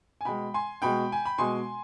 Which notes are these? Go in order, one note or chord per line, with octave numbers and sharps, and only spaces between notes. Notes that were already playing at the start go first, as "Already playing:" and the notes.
G#5
B2 G#3 G5 B5
G#5 C6
B2 G#3 G5 B5
G#5
B5
B2 G#3 G#5 C6